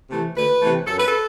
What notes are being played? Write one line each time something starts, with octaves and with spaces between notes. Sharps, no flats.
C3 E3 A3
D2 B4
C3 E3 A3
F#2 A4
B4
A4